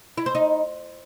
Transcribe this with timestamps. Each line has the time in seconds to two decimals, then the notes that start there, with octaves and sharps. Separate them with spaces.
0.18 E4
0.26 C5
0.35 D#4